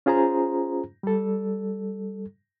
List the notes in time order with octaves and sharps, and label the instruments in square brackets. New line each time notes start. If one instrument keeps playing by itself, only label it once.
[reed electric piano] C#4 F4 G#4 C5 A#5
G3 A4